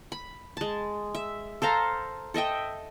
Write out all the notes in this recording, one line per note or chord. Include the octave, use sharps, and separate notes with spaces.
B5
G#3 A5
E5
A4 C5 F5 A#5
A4 D#5 E5 G5